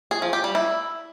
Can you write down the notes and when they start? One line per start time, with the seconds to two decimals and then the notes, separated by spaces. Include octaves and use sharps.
0.11 G#4
0.22 F3
0.33 G4
0.44 G3
0.55 E4